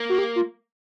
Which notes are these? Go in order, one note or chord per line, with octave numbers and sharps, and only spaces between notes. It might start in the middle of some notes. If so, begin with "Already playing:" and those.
Already playing: A#3
F#4
G4
F4